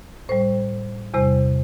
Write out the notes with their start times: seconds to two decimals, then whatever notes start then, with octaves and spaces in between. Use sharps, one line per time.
0.29 A2 G3 C5
1.14 E2 C3 G3 C5